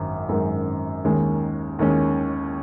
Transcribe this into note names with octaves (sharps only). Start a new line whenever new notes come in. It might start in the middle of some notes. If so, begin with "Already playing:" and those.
Already playing: G#1 F#2 D#3
G#1 F#2 D#3 G#3
D#2 D#3 G#3 C#4
D#2 D#3 G#3 C#4